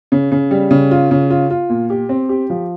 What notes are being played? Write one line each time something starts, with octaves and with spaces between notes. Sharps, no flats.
C#3
C#3
G3
C#3
F4
C#3
F4
F4
A#2
G4
C4
G4
F3